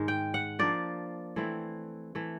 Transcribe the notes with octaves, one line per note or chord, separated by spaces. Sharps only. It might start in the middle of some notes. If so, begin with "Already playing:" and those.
Already playing: G#2 D#3 G#3
G5
F#5
F3 A#3 D4 D5
E3 A3 C4 E4
E3 A3